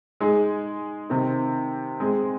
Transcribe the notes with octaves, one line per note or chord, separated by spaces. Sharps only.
G#3 D#4 G#4
C3 D#3 C4 D#4
G#3 C4 G#4